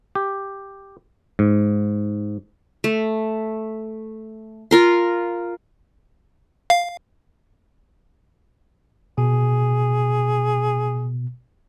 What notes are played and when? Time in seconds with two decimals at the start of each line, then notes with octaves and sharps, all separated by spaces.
0.15 G4
1.39 G#2
2.84 A3
4.71 F4 A#4 C6
6.70 F5
9.18 B2 G#4